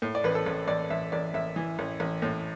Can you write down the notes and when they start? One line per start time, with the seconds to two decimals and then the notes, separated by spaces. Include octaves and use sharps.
0.02 A2
0.15 D5
0.24 A1 B4
0.35 A4
0.46 A1
0.68 A1 D5
0.90 A1 E5
1.12 A1 D5
1.34 A1 E5
1.56 E3
1.79 A1
2.00 A1
2.22 A2